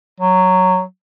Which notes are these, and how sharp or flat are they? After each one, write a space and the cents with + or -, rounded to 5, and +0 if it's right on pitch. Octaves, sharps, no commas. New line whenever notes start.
F#3 +0